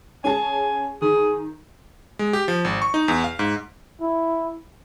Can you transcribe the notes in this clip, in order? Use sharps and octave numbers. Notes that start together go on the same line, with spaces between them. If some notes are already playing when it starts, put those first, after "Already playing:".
C#4 G#4 G#5 A5
D#3 G#4
G#3
G4
F3
G#1
C#6
D#4
E2
F5
G#2
E4